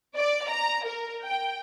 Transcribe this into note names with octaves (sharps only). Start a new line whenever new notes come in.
D5
A#5
A#4
G5